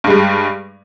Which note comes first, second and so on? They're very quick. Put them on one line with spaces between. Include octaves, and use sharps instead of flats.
G2 G#3 G3